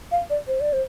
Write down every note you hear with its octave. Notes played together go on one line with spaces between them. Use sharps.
F5
D5
C5
D5
C5